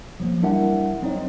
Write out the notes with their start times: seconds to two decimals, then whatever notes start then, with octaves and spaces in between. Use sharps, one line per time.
0.20 F3 F#3 A#3
0.42 G3 D4 E4 A#4 E5 F#5
1.02 F#3 C4 D#4 C#5 D#5